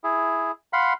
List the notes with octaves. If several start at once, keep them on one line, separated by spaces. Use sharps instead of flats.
E4 G#4
F5 F#5 B5 C6